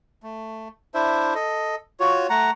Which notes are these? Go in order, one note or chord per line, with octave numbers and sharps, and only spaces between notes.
A3
D4 E4 C5 E5
A4 D#5
F4 F#4 C#5
A3 F#5 A#5